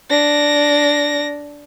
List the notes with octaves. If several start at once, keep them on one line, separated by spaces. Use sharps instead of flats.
D4 A#6